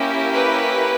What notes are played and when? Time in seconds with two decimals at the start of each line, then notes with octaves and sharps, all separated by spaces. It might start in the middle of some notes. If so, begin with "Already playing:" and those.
Already playing: A#3 C#4 E4 G4
0.32 B4